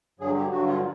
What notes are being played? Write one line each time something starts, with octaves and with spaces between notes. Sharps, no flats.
G2 D3 F#3 G#4
G4
G2 D3 F#3 F#4
F4